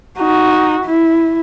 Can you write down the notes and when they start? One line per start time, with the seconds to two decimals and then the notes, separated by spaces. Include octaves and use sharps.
0.19 D#4 F#4
0.85 E4